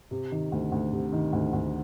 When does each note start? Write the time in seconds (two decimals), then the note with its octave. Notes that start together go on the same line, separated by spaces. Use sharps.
0.11 C3
0.31 D#3
0.52 D2
0.72 D2
0.92 C3
1.12 D#3
1.33 D2
1.53 D2